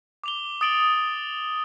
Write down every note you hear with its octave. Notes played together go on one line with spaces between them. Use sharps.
D6 F7 G7
D#6 A6 D7 F#7 G7